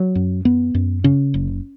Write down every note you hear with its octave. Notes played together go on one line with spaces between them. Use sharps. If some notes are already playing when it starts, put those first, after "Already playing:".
Already playing: F#3
F#2
F#2 B3
F#2
C#3 C#4
F#1